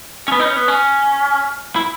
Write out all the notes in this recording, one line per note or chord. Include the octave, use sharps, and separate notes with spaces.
C#4
B3
D#4
C#4
B3
C#4
E4